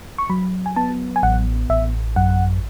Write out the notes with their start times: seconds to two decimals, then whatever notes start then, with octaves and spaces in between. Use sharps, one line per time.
0.18 C#6
0.30 F#3 B5
0.66 G#5
0.76 B3 A5
1.16 G#5
1.23 A1 F#5
1.70 A1 E5
2.16 F#2 F#5